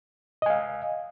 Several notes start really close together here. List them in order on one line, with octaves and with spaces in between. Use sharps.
D#5 G#5 F5